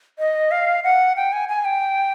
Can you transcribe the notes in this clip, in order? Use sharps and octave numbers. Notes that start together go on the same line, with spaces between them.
D#5
F5
F#5
G5
G#5
G#5
G5